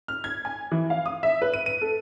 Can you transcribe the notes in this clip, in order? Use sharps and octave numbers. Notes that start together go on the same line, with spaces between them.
F6
G#6
G#5
E3
F5
D#6
E5
B4
D#7
D#7
A4